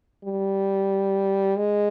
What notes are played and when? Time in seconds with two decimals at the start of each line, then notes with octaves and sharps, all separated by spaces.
0.24 G3
1.58 G#3